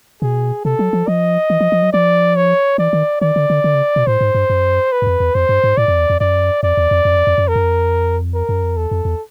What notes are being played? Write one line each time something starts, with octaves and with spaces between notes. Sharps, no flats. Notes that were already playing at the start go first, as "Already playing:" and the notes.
B2 G#4
C3 A4
F#3
F3
F3 D#5
E3
F3
F3
F#3
F3 D5
C#5
E3 D5
D#3
D#3 D5
D3
D3
D3
C#3
B2
A2 C5
G#2
G2
F#2
B4
F#2
F2
E2
F2 C5
G2
G#2
A2 D5
F2
E2
F2
F#2 D5
F2 D5
E2
F2
F2
F#2
F2
F2
F#2
F2 A#4
F#2
F2
A#4
F#2
F2
E2 A4
F2
E2